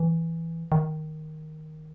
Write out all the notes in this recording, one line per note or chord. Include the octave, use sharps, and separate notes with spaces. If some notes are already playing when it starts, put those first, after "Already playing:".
Already playing: E3
D#3